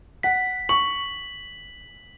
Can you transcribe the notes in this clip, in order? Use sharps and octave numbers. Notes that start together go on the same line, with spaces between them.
F#5 B6
C#6 F#7